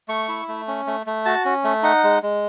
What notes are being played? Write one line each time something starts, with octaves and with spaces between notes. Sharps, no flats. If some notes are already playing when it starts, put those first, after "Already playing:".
A3 C#6
E4
A3
C#4
A3
A3
F#4 A5
C#4
A3
D#4 F#5
G#3
G#3